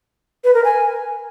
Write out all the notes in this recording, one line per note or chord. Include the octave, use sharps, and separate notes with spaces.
B4
A#4
G#5